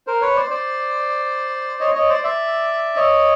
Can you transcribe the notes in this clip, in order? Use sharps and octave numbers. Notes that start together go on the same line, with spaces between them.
A#4 C5
B4 C#5
C5 D5
C5 D5
C#5 D#5
C#5 D#5
C5 D5
D5 E5
C#5 D#5